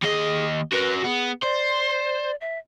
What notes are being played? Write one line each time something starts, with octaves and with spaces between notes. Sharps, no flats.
D#2 G#4 D#5
F#4 A#4 B4
B3 G#4
C5 D5
E5